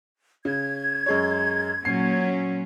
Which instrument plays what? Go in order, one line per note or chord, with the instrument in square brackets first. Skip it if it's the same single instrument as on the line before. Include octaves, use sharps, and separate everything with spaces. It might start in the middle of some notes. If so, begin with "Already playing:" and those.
[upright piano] C#3 [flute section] G#6
[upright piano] F#2 G#3 C#5
[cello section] A#2 F#3 C#4 [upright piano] C7